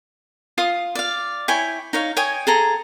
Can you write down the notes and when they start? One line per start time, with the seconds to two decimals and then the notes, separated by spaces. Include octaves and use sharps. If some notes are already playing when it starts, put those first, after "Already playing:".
0.58 F4 F5 D#6
0.95 D5 F5
1.48 E4 C#5 G5 G#5
1.93 D#4 C#5 F5
2.17 C#5 G5 G#5 D#6
2.47 G#4 A4 A#5